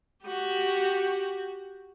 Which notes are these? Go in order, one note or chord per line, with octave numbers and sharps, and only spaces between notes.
F#4 G4